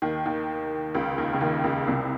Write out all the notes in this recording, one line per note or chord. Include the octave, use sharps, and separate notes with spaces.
D#2 D#3
D#2 D#3
C#2 C#3
D#2 D#3
C#3
D#2 D#3
C#2 C#3
C2 C3